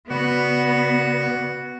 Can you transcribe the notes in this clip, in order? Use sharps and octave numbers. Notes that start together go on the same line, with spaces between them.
C#3 B3 F#4 D5